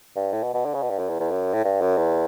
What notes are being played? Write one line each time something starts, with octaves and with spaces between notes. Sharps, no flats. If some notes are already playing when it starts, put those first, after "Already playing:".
G2
A2
B2
B2
D3
C#3
B2
G2
F#2
E2
E2
F#2
A2
G2
F#2
E2